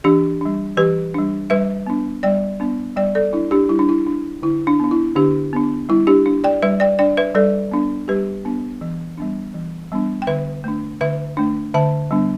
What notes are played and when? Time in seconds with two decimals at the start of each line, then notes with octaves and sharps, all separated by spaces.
0.04 E3 D4 G4
0.41 G3 D4
0.77 E3 G4 B4
1.14 G3 D4
1.50 G3 B4 E5
1.87 B3 D4
2.23 G3 D5 G5
2.60 B3 D4
2.96 G3 D5 G5
3.15 A4 D5
3.33 D4 E4
3.51 D4 G4
3.69 G3 E4
3.79 D4
3.89 E4
4.06 D4
4.42 D3 E4
4.67 D4
4.80 B3 D4
4.91 E4
5.16 D3 D4 G4
5.53 B3 D4
5.89 G3 E4
6.07 D4 G4
6.26 D4
6.44 D5 G5
6.62 G3 B4 E5
6.80 D5 G5
6.99 D4 D5 G5
7.17 B4 E5
7.35 G3 A4 D5
7.71 B3 D4
8.08 G3 G4 B4
8.45 B3 D4
8.81 E3
9.18 G3 B3 D4
9.54 E3
9.92 G3 B3 D4
10.22 G5
10.27 D3 B4 E5
10.64 A3 D4
11.01 D3 B4 E5
11.37 A3 D4
11.74 D3 E5 A5
12.11 G3 B3 D4